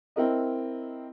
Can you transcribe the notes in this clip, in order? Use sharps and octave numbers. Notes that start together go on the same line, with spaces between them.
C4 E4 A#4 D#5